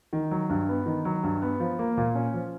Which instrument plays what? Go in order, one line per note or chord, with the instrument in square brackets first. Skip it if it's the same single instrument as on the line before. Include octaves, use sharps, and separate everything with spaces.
[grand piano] D#3
F#3
G2
B3
D#3
F#3
G2
B3
F3
A#3
A#2
C#4
F3